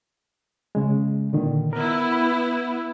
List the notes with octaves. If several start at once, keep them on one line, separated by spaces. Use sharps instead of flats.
C#3 G#3
A#2 D3 D#3
B3 E4 A#4
B5